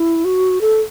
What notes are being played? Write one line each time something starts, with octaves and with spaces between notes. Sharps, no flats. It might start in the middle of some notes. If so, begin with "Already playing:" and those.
Already playing: E4
F#4
A4